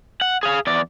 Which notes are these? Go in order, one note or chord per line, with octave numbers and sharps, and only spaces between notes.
F#5
G#4 F5
E2 D5